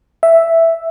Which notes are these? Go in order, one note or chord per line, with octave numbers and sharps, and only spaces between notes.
E5